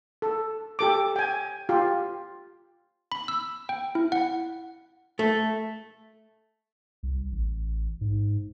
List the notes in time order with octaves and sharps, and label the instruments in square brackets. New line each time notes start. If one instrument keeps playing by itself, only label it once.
[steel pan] A4
G4 A4 D6
G5 G#5
F4 G4
[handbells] B5
E6
G5
E4
F#5
[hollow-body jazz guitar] A3
[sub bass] C2
A1
G#2